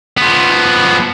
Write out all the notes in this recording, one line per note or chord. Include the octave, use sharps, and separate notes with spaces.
F3 B3